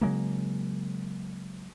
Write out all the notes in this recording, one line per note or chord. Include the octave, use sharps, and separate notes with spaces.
C#3 F#3 G#3 A#3